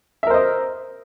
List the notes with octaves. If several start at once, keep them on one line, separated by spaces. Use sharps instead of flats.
A#4 C5 D#5 E5